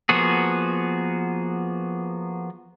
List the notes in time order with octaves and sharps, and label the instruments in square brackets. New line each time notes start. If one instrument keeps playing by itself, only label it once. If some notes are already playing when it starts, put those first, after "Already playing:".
[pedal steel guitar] F3 A#3 B3 F#4 G#4